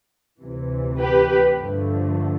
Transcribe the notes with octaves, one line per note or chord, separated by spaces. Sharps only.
D2 C3 E3
G4 B4
G2 D3 F3 A3